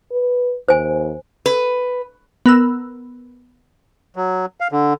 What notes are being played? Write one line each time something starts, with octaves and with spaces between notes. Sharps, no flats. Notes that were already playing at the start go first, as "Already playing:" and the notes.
B4
D#2 C5 G#5
B4
B3 A#4 E6
F#3
F5
D3